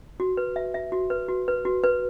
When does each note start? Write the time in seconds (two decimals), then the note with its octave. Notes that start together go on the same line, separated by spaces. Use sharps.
0.20 F#4
0.37 B4
0.56 E5
0.74 E5
0.92 F#4
1.10 B4
1.29 F#4
1.48 B4
1.65 F#4
1.84 B4